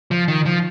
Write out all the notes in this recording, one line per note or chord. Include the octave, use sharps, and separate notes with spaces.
F3
D#3
F3